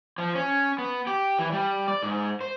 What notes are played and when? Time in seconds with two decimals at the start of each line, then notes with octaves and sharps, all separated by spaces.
0.18 F3
0.35 C#4
0.78 B3
1.07 G4
1.39 E3
1.52 G3
1.88 D5
2.03 G#2
2.41 C5